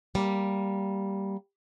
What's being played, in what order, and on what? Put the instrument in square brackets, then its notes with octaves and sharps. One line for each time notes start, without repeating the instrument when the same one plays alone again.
[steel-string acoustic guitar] G3 A#3